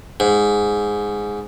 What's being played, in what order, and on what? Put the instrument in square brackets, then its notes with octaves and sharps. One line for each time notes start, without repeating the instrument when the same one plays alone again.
[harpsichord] G#2